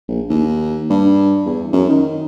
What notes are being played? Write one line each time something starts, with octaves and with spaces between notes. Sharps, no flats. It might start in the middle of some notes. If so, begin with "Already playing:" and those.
A#1
D#2
G2
E2
F#2
D#3